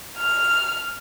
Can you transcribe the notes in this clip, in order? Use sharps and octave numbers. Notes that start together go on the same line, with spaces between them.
F6